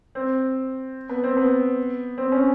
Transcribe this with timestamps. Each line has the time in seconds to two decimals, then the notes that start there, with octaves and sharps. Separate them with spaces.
0.15 C4
1.09 B3
1.24 C4
1.37 B3
2.18 C4
2.32 C#4